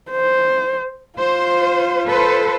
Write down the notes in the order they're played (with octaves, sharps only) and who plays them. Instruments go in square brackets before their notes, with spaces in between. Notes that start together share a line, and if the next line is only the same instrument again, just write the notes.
[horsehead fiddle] C5
[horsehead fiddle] F4 [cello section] C5
[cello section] A4 B4 C5